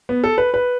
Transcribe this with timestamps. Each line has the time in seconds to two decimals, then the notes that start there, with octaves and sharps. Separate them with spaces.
0.09 B3
0.24 A4
0.38 B4
0.54 B4